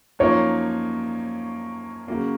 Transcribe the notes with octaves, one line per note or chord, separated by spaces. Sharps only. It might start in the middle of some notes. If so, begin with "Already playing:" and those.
F#2 F3 A#3 D#4 C#5
C#3 F#3 A#3 C#4